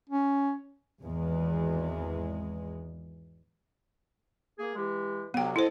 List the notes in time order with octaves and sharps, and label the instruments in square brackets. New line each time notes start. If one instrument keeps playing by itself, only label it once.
[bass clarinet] C#4
[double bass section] G#1 E2 G#3
[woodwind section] A#3 G#4
E3 G#3 G4
[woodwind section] D2 C3 F#3 [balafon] B3 G5
[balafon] E4 C5 [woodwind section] A4 D#5